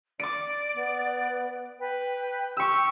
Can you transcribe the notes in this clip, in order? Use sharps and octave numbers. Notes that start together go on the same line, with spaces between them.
D5 D6 D7
B3
B4 G5
G4 C#6 E6